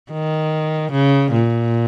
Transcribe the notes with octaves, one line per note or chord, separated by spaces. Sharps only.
D#3
C#3
A#2